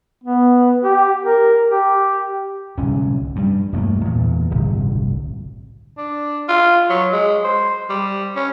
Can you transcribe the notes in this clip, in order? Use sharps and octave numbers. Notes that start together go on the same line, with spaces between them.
B3
G4
A#4
G4
D1 C2 C#4
G2 G3
E1 G2 A3 A#3
E2 A#2
D1 G1 C2
D4
F4
F#3
G#3
C5
G3
C#4